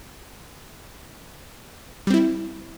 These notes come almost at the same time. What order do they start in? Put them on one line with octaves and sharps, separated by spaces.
G3 C4 E4